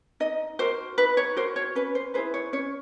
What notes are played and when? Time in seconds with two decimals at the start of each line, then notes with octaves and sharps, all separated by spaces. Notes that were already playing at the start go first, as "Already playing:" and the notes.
0.20 D#4 D#5
0.59 F#4 A#4 C5
0.98 D#4 B4
1.17 C#5
1.37 F#4 A#4 C5
1.56 C#5
1.75 C#4 B4
1.95 C5
2.14 E4 G#4 B4 C5
2.34 C#5
2.53 C#4 C#5